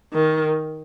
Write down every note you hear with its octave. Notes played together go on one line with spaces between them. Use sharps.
D#3